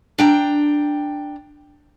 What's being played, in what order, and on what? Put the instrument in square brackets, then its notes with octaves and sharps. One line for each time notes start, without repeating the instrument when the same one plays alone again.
[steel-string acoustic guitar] D4 G5 A#5